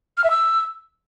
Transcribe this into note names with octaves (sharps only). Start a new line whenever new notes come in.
F6
E5
E6